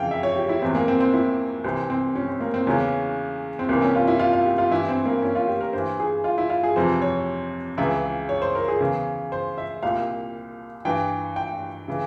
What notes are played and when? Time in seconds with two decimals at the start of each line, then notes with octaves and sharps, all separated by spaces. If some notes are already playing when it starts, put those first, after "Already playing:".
Already playing: F2 C#3 E3 F5 G5
0.11 E5
0.23 C#5
0.36 G4
0.49 E4
0.62 E2 E3 C4
0.75 A#3
0.88 C4
1.00 C4
1.13 E4
1.64 C2 C3 E3 C4
1.90 C4
2.15 C#4
2.28 C4
2.40 A#3
2.54 C4
2.67 E2 C#3 E3 C#4
3.59 C4
3.69 C2 C3 E3 A#3
3.82 C#4
3.95 F4
4.07 E4
4.20 F4
4.33 F4
4.46 G4
4.58 F4
4.71 G2 E3 E4
4.88 C4
5.05 A#3
5.22 C#4
5.35 F4
5.48 G4
5.61 A#4
5.73 G2 E3 C5
6.00 G#4
6.24 F4
6.38 E4
6.50 F4
6.63 G#4
6.75 F2 C3 E3 C5
7.02 C#5
7.78 C#2 C#3 E3 E5
8.29 C#5
8.42 C5
8.55 A#4
8.68 G#4
8.80 E2 C#3 E3
9.32 C5
9.58 E5
9.83 C2 A#2 F5
10.85 G2 E3 G5
11.36 G5
11.88 C#3 E3